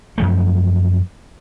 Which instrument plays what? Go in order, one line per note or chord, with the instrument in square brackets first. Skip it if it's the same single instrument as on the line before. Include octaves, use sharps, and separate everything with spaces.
[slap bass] F#2 F3 A3